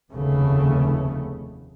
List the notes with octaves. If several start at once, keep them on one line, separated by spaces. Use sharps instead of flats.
F1 D#2 C#3 A3 B3